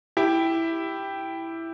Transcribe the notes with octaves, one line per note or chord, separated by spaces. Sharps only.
E4 G4